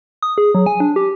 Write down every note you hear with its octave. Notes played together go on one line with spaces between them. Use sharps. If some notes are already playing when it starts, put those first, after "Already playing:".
D#6
G#4
F#3
G#5
D4
G4